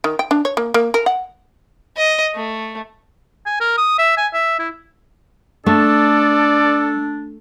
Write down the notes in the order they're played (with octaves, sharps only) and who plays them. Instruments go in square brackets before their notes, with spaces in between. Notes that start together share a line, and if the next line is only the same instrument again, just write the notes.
[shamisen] D#3
G5
D4
C#5
A#3
A#3
A#4
F#5
[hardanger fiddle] D#5
A3
[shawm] G#5
A#4
D#6
E5
G#5
E5
E4
[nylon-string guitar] A3 [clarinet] D4 [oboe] A4 [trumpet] D5